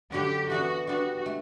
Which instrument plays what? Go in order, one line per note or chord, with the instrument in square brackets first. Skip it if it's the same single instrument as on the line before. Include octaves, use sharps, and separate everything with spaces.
[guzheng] F#2 D3 F#3 [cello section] G4
[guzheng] E3 B3 D4 [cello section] F#4
[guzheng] G3 B3 D4 [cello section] F#4
[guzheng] A3